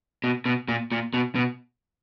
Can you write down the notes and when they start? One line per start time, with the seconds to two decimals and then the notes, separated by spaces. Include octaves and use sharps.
0.24 B2
0.46 B2
0.68 A#2
0.92 A#2
1.14 B2
1.35 B2